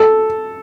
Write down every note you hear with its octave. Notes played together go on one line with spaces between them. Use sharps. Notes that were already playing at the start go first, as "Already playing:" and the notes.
Already playing: A4